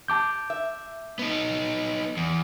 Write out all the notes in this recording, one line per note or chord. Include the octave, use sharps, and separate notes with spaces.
A5 D6 G6
E5
B3 D#4
E2